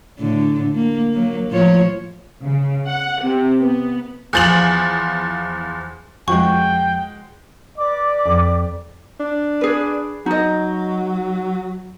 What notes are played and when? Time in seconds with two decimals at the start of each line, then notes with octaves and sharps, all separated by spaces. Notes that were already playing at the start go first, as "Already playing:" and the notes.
0.19 A2 D3
0.75 A#3
1.14 F#3 A#3
1.50 A2 F3 C#5
2.43 C#3
2.86 F#5
3.24 C3
3.62 B3
4.33 E2 F3 F#7
6.28 F2 F3 G#3 F#4 G5 C#6
7.78 B4 D5 D6
8.25 F2
9.20 D4
9.61 G#4 B4
10.26 F#3 D#4 D#5